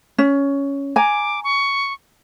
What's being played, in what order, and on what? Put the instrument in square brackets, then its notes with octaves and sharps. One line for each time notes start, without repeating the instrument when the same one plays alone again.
[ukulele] C#4
[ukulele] G#5 A#5 [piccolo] D6
[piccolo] C#6